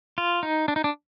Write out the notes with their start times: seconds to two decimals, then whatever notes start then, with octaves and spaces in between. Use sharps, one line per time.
0.18 F4
0.43 D#4
0.68 D4
0.76 D#4
0.84 D4